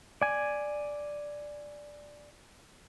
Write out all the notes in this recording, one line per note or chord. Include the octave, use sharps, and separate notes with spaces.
D5 G#5